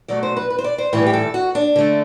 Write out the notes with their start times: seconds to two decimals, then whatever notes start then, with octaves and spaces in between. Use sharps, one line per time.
0.08 B2 F#3 A3 D5
0.23 C5
0.37 B4
0.50 B4
0.58 C5
0.64 D5
0.78 C5
0.93 A2 E3 G3 B4
1.06 G4
1.13 A4
1.34 F#4
1.55 D4
1.76 D3 A3